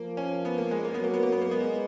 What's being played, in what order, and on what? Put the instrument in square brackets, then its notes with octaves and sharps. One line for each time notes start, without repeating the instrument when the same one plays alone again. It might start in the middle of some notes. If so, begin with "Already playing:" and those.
Already playing: [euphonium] F3 [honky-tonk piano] A#3
[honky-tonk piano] C#4
B3
A#3
G#3
A#3
[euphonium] F#3 [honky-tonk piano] B3
[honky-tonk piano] A#3
B3
A#3
B3
A#3
[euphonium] G#3 [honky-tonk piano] B3
[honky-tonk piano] A#3